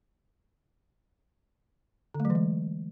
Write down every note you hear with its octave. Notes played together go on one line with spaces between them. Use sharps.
D3
A3
F#3
E3
G#3